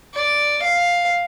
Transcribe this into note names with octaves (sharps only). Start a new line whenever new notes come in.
D5
F5